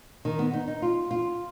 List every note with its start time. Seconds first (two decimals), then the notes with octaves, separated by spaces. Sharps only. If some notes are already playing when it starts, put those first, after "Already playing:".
0.25 D#3
0.39 B3
0.53 D#4
0.68 D#4
0.82 F4
1.11 F4